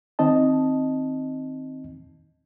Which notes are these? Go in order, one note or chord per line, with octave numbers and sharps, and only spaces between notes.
D#3 C4 D#4 D#5 A5